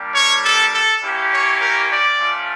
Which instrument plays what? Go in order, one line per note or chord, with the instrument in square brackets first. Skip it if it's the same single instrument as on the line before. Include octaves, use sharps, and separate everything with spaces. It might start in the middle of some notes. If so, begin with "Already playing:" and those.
Already playing: [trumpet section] G3 A#3 D4 G4
C#5
A4
A4
A#3 C#4 E4 G4
C#5
A#4
D5
A3 C#4 F4